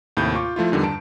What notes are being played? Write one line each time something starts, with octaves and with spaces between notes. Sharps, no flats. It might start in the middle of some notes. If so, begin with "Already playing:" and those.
D#2 A2 C3 A3 B5 G6
F4 C#6 D6
F3 A3 E4 F4
E2 D3 D#3 G3
G2 A5 D7